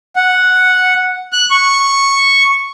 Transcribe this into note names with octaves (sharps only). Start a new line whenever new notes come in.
F#5
F#6
C#6